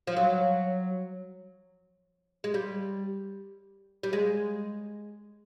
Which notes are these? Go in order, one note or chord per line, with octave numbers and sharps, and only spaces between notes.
F3
F#3
G#3
G3
G3
G#3